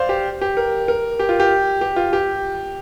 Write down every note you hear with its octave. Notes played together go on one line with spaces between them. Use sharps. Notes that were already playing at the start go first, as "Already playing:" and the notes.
Already playing: C5 D5 F5
G4
G4
A#4
A#4
G4
F4
G4
G4
F4
G4